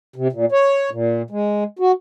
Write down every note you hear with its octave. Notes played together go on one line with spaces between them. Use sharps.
C3
A#2
C#5
A#2
G#3
F#4